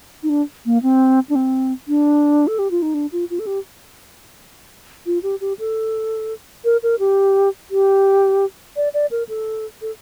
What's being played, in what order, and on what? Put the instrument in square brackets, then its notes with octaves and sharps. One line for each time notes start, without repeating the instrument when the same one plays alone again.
[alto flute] D#4
D4
A#3
C4
D4
C4
D4
A4
G4
F4
D#4
D4
F4
F4
A4
G4
F4
G4
G4
A4
A#4
A#4
G4
G4
D5
D5
A#4
A4
A4